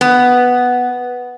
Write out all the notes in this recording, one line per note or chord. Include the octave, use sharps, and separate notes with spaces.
B3